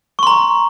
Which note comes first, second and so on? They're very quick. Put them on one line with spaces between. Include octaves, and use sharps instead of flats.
C#6 C6 A#5